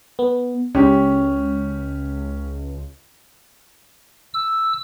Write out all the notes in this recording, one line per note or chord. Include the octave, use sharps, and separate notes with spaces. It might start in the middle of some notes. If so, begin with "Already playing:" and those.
B3
C#2 C#4 G4
E6